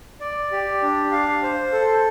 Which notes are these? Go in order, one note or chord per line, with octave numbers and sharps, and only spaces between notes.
D5
G4
D4
F5
C5
A4